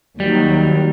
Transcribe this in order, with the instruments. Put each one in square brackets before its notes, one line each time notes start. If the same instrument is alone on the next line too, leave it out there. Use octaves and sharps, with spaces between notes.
[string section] D#2 D#3 F#3 [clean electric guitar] G3